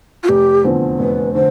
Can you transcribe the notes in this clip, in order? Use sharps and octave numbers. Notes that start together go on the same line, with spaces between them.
F4
F1 G4
E2 D3 F3 C4
F1 B4
D3 C5